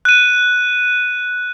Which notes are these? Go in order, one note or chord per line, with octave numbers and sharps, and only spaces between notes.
F#6 D#7